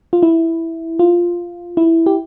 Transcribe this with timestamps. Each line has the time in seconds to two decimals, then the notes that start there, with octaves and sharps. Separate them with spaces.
0.13 F4
0.23 E4
0.99 F4
1.77 E4
2.06 G4